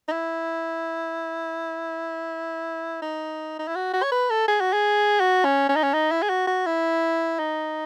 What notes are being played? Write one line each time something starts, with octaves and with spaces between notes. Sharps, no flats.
D#4
E4
D#4
D#4
E4
F#4
F#4
C#5
B4
A4
G#4
F#4
G#4
F#4
C#4
C#4
D#4
C#4
D#4
E4
G#4
F#4
F#4
E4
D#4